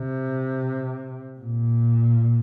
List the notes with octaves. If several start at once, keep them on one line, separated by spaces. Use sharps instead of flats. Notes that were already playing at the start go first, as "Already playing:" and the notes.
Already playing: C3
A#2